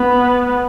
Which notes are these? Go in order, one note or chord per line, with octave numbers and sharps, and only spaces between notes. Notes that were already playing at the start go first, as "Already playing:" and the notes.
Already playing: B3